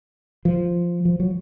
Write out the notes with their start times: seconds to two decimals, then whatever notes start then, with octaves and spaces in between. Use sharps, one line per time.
0.45 F3
1.05 F3
1.20 F#3